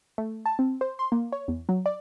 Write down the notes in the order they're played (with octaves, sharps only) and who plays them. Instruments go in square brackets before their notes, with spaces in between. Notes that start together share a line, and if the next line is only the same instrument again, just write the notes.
[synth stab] A3
A5
C4
C5
C6
A#3
C#5
E2
F#3
D5